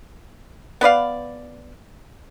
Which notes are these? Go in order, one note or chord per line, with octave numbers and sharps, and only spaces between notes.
B3 B4 D5 F5